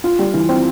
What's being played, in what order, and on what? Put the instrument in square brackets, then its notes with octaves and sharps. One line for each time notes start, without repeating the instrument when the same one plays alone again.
[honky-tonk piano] F4
G3
E3
C4